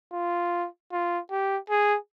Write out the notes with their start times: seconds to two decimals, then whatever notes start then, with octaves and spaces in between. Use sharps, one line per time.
0.13 F4
0.92 F4
1.31 G4
1.70 G#4